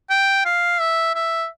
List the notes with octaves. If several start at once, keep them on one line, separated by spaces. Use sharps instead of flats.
G5
F5
E5
E5